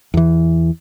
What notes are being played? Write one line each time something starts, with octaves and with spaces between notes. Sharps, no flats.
E2 E3